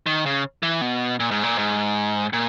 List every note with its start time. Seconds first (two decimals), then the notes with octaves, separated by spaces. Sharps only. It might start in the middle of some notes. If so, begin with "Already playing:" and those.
0.06 D#3
0.26 C#3
0.63 E3
0.81 B2
1.20 A#2
1.31 G#2
1.43 A#2
1.58 G#2
2.33 A#2